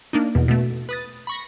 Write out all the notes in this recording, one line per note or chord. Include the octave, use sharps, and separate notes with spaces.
A#3 D4 D#4
E2 B2
B2 A3
B4 D#6 A6
B5 C#6 A#6